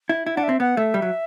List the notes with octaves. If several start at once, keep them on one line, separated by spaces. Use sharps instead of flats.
E4
E4
D4 F#5
E5
C4
B3 F#5
A3 E5
G3
F#3